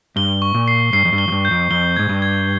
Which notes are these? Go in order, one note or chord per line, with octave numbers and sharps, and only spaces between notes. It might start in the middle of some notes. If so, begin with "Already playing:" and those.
G2 G7
C#6
A#2
C7
G2 C7
F2
G2
G7
F2
G2
G6
F2
F2 G7
G#2 G#6
G2
G#6